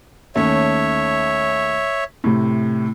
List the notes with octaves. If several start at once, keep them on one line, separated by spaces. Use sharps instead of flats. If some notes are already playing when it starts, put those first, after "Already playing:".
D#2 A3 C#4 C#5 E5
A2 C3